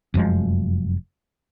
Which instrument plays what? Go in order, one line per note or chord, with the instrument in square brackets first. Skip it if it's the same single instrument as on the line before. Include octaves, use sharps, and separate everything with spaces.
[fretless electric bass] F1 F#2 F3 G#3